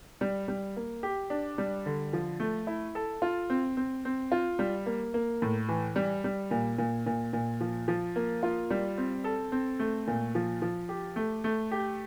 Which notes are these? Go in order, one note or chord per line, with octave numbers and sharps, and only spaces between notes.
G3
G3
A#3
G4
D4
G3
D3
F3
A3
E4
A4
F4
C4
C4
C4
F4
G3
A#3
A#3
A2
E3
G3
G3
A#2
A#2
A#2
A#2
F3
F3
A#3
F4
G3
C4
A4
C4
A3
A#2
F3
F3
G4
A3
A3
G4